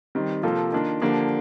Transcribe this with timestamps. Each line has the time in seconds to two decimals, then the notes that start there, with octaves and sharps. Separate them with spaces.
0.15 D#3 G3 C4
0.43 C3 F3 A#3 F4 A4
0.72 D#3 A#3 D4 F4
1.02 D3 F3 A#3 D4 G4